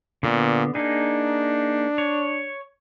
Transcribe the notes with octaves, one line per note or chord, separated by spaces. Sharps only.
A#2 D3 B3
A#3 D4 D#4 G#4
C#5